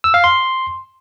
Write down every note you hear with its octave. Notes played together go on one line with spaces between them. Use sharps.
E6
F5
C6